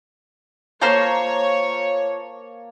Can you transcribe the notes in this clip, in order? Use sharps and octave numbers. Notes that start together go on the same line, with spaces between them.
A#3 F4 C5 C#5 A5 A#5 G6